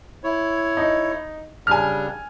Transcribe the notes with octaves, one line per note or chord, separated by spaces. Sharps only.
E4 C#5
D#4
C#3 G3 D4 G#5 F6